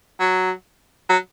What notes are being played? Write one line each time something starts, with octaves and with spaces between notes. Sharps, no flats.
F#3
F#3